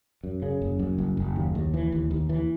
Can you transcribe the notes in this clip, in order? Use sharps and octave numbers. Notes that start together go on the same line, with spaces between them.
F#2
C#3
F#1
F#2
F#1
F#1
D#2
D#2
E3
D#2
D#2
E3